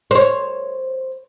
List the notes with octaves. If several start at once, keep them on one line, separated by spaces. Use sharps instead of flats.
C5 C#5